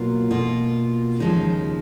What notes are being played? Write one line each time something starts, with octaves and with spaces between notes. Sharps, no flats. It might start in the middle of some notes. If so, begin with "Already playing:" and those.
Already playing: B2 F#3 A#3 F4
B2 A#3 F4
D#2 C#3 F3 G#3 D#4